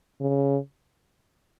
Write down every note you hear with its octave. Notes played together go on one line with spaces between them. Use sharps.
C#3